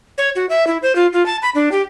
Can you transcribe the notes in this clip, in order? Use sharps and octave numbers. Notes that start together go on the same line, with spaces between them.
C#5
F#4
E5
E4
C5
F4
F4
A5
B5
D4
G4